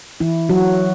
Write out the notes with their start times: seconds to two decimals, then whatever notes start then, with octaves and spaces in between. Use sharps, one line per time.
0.20 E3 E4
0.49 F#3 F#4